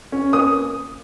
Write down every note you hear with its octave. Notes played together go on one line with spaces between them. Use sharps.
C#4
A#3 D#6